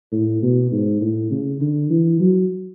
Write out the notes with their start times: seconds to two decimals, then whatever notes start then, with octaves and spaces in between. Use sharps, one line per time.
0.12 A2
0.43 B2
0.72 G#2
1.01 A2
1.31 C#3
1.61 D3
1.90 E3
2.20 F#3